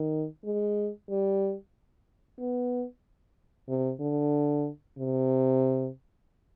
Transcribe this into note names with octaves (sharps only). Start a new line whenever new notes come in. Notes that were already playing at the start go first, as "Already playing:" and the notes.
Already playing: D#3
G#3
G3
B3
C3
D3
C3